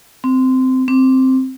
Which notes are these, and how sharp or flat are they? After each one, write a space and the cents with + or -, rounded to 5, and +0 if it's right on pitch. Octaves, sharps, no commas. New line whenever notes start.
C4 -15
C4 +0